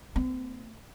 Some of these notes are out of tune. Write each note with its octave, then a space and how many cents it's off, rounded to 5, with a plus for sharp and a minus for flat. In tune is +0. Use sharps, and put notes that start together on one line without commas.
A3 +35 C4 -45